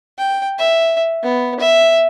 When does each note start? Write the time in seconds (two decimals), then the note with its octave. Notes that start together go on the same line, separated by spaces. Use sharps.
0.18 G5
0.59 E5
1.23 B3
1.60 E5